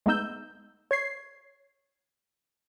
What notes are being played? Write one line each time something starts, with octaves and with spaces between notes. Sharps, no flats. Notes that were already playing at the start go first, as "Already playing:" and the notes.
G#3 A3 B3 D#4 E6 G6
C#5 G#6 C7